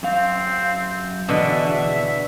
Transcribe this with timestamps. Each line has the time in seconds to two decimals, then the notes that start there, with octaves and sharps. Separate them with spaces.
0.03 F#2 C4 F5
1.29 E2 B2 D3 D4 E5